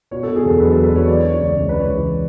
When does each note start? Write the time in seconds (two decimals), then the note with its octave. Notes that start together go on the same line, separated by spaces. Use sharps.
0.11 B2 C#5
0.23 A4
0.27 B2
0.35 G#4
0.44 E2 A4
0.60 F#3 B4
0.72 A4
0.76 E2
0.84 B4
0.92 F#3 C#5
1.08 E3 D5
1.20 C#5
1.25 E3
1.32 C#5
1.40 C#2 D5
1.56 C#2
1.69 C#2 B4
1.80 C#5
1.89 E3